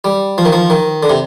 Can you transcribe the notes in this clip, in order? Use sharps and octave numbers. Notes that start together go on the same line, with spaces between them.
G3
F3
D#3
F3
D#3
D3
C3